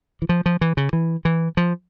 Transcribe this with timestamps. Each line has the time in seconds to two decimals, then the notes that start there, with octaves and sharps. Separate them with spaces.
0.22 E3
0.29 F3
0.46 F3
0.61 E3
0.77 C#3
0.93 E3
1.25 E3
1.57 F3